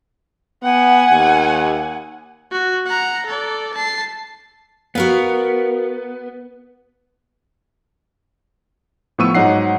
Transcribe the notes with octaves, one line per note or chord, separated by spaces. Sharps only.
B3 F#5 G#5
D#2
F#4
F#5 A#5
A4 D5
A5 C7
B3 F#4 A#4 F5
A2 F3 B3 C#6 E6 D#7
G#2 F#3 D#4 C#5 F#5 C7